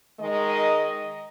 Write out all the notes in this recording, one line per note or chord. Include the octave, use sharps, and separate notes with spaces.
D#3 G#3 D#5